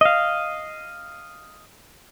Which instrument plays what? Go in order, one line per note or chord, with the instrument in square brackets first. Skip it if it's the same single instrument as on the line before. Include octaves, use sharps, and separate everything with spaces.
[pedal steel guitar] D#5 F5